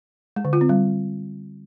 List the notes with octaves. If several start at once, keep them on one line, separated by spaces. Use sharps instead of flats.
G#3
D3
F4
C4
G3